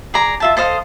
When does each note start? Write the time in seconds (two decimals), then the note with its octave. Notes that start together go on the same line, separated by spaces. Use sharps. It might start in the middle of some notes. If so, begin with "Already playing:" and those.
0.14 G#4 D5 A#5
0.40 F4 E5 A5
0.57 A4 C5 D#5 F5